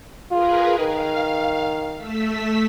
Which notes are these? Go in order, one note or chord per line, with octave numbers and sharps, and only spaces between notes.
F4 G#4 A#4 B4
D#3 F5
A3 E6 B6